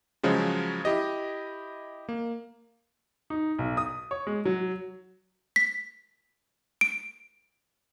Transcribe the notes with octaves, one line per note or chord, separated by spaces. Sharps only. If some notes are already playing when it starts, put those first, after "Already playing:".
C#3 F3 F#3 G#3 C#4
E4 G4 D#5
A#3
D#4
B1
D#6
C#5
G#3
F#3
B6
D7